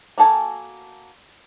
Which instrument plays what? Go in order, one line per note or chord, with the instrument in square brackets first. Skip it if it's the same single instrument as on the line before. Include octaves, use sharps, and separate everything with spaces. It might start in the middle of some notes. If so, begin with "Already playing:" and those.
[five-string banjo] A#3 F#4 A4 G#5